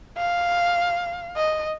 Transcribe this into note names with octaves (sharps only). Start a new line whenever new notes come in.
F5
D#5